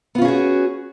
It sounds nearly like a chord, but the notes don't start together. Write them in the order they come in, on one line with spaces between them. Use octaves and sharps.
B3 F4 C#4 G#4 F#4